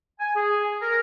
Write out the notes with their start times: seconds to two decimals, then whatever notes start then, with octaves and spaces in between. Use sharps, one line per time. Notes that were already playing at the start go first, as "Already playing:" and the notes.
0.19 G#5
0.35 G#4
0.82 A#4